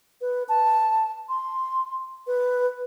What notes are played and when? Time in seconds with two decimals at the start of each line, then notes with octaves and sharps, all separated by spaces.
0.21 B4
0.49 A5
1.29 C6
2.27 B4